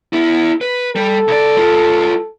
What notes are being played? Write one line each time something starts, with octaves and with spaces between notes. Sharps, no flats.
B3 E4
B4
G3 A4
C2 D5
G#3 F4